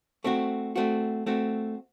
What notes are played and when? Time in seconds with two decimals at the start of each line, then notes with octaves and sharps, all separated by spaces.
0.24 A3 C4 F#4
0.76 A3 C4 F#4
1.27 A3 C4 F#4